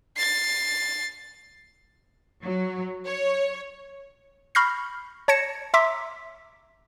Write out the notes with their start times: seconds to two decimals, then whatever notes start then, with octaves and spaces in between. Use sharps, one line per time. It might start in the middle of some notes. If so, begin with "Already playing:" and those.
0.17 A6 C7
2.43 F#3
3.06 C#5
4.55 B5 C#6 F6 G6 A#6 C7
5.28 C#5 A5 G#6 A#6 C#7 E7
5.74 E5 A#5 C6 D6 E6 B6